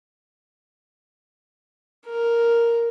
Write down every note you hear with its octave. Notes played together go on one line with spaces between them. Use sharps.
A#4